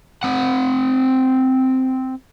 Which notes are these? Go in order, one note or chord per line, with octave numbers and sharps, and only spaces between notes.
C4 F#5